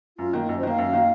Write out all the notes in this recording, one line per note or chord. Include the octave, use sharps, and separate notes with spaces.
F#2 F4
D#3 A#3
F#2 D#5
C5
D#3 A#3 F5
F#2
D#3 A#3